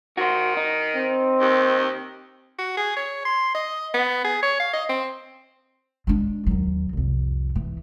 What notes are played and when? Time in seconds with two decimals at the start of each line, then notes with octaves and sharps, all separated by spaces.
0.17 D#3 F#4 C5
0.57 D#4
0.95 C4
1.41 D#2
2.58 F#4
2.77 G#4
2.96 C#5
3.25 C6
3.54 D#5
3.94 B3
4.24 G#4
4.43 C#5
4.60 F5
4.73 D#5
4.89 C4
6.07 G#3 D4
6.47 D#2 F#3
6.93 C2 F2
7.55 E3